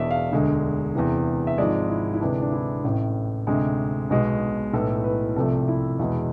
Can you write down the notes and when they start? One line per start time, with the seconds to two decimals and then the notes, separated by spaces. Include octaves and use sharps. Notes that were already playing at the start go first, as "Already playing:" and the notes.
Already playing: E1 E2 B2 D5 E5
0.11 F5
0.32 E1 D2 D3 G#3
0.95 E2 C3 E3
1.47 E5
1.58 G#1 G#2 F3 G#3 D5
1.90 E4
2.14 E4
2.21 D2 C3 E3 G#3 D4
2.42 D4
2.52 E4
2.84 A1 A2 E3
3.47 D2 C3 G#3
4.10 B1 B2 G#3
4.73 B1 A2 E3 A3 A4
5.04 B4
5.36 C2 C3 F3 A3 A4
5.68 E4
5.99 E2 B2 G#3 E4